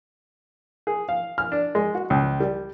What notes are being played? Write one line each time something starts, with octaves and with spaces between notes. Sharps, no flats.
G#4
F5
F6
D4
G#3
F#4
C#2
G3